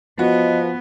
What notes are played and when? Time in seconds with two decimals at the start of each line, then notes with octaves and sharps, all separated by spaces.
0.19 F3 B3 F#4 D#5